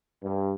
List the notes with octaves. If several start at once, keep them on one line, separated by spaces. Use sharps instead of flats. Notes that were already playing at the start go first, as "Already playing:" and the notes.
G2